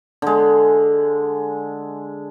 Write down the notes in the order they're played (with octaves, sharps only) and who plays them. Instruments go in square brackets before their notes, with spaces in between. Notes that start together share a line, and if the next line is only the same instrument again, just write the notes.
[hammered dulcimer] D3 G#3